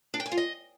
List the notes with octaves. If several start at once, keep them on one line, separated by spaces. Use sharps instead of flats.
D4
G5
G#5
F4
D#5